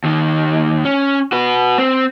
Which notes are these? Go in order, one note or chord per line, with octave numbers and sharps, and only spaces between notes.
D#2 D#3
C#4
F#4 B4
C4